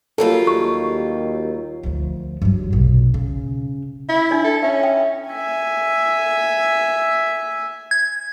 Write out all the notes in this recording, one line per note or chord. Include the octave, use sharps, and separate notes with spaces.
F#3 G3 A#3 F4 A4
D#2 C#6
D2 F3
G2 F#3
F1 B1
C#3
E4
D4 D#4 D5
A4
C#4 E5
E5 G5
E5 G#5
G#6